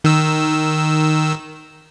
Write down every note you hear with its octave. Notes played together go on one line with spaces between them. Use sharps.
D#3 E6